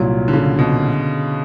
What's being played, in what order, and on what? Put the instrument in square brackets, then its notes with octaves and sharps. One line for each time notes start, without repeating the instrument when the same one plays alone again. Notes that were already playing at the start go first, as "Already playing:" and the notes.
Already playing: [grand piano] C2 A#2 F#3
[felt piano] D3
C#3
B2